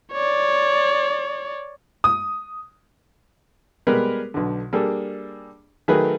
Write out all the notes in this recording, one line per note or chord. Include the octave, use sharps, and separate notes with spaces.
C#5 D5
D#6
G3 G#3 B3 A#4 B4
B1 D3
G3 A#3 D4 G#4 A4
D#3 F#3 A3 G#4 A#4 B4